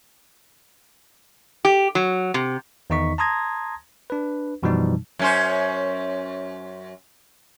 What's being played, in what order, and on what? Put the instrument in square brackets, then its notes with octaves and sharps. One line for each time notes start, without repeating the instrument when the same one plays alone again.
[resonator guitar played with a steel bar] G4
F#3
C3
[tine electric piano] E2 D#3 D#4 D#5 C#6 B6
A5 A#5 C6 D#6 G#6 A#6
D4 B4
F#2 B2 E3 F3 G3 D#4
[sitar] F#2 C#4 C5